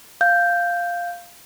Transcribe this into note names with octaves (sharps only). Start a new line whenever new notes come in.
F5 G6